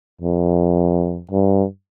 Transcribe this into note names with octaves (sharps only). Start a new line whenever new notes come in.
F2
G2